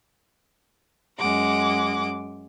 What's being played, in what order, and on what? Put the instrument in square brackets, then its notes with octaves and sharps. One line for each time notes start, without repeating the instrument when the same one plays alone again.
[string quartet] F#2 G#3 F#5 D6